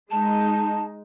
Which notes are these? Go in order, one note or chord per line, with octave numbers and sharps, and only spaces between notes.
G#3 D#4 A5